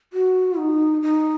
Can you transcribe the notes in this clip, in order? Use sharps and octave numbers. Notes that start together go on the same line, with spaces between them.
F#4
D#4
D#4